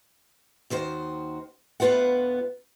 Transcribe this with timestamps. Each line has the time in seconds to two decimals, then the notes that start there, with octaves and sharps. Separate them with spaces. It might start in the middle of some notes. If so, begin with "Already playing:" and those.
0.70 D#2 D#3 F#4 C5
1.80 D2 A2 B3 F4 B4 F#5